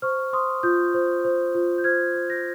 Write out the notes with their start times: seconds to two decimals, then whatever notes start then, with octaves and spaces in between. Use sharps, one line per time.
0.02 C5 C#6 F6
0.33 C5 C6 D#6
0.63 F4 D#6 G6
0.94 C5
1.25 C5
1.55 F4
1.78 G6
1.84 C5 F6 G#6
2.15 C5
2.30 G6 A#6